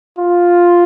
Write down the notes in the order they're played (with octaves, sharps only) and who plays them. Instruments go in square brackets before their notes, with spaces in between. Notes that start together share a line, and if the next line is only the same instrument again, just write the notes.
[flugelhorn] F4